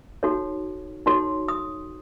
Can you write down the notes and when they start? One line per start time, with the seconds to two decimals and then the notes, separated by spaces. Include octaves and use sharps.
0.23 D#4 F#4 A4 C#5
1.06 D#4 F#4 A4 C#5 C6
1.48 D#6